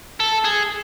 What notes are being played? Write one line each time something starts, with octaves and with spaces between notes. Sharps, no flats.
A4
G#4